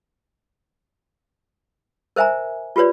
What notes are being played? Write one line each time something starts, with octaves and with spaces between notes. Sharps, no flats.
A#4 C5 E5 G#5 A#5
F4 G4 B4 C#5 D5